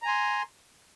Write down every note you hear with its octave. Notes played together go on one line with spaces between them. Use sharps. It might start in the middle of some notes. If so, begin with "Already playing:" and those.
G#5 A#5 C6